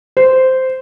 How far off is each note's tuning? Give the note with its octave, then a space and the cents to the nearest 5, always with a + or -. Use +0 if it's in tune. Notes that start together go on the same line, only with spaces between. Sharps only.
C5 -10